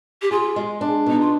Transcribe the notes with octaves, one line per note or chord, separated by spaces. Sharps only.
G4
F4 G#4
G#3
D4
B2 D#4
F4